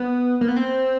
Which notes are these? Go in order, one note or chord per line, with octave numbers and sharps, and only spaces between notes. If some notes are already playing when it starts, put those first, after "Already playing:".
Already playing: B3
A#3
B3
C4